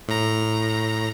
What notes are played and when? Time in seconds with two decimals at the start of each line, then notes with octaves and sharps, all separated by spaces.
0.08 A2 A#5